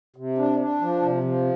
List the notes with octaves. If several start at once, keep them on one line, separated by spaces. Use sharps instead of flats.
C3
D4
D4
F3
C3
F3